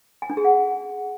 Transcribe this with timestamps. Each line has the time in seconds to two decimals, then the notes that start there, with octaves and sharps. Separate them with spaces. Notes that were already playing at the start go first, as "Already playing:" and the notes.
0.22 G#5
0.30 D4
0.37 G#4
0.45 F#5